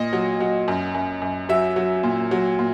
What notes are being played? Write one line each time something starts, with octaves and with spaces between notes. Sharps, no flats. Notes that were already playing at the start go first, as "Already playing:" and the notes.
Already playing: A#2 D#5
F#3
F#3
F#2
F#2
F#2
F#3 E5
F#3
A#2
F#3
A#2